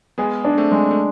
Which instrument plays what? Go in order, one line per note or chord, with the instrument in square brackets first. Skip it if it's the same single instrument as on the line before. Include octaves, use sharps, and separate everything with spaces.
[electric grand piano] G#3 B3 [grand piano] G#4
[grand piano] D4
[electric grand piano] A3 C4
[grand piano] G#3
[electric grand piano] A3